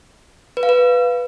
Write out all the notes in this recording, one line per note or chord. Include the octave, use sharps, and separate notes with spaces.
B4
F5
B4